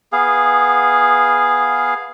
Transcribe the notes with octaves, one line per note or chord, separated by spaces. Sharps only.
B3 G#4 F5